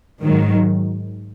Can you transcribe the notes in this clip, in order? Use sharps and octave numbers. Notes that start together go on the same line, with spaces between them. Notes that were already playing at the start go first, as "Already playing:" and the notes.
G#2 D#3 F#3